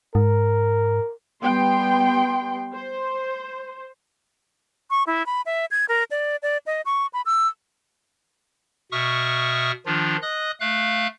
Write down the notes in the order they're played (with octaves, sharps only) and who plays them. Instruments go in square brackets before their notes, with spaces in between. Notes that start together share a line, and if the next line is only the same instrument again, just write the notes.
[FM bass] G#2 [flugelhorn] A#4
[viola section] G3 B3 G5 C6
C5
[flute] C#6
E4
B5
E5
G#6
A#4
D5
D5
D#5
C#6
B5
E6
[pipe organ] B2 E5 C#6 D#6 F6
D#3 F3 D4 F4
D#5 D#6 F#6
A3 F5 F#6